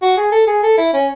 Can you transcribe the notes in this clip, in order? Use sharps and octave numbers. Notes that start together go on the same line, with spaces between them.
F#4
G#4
A4
G#4
A4
E4
C#4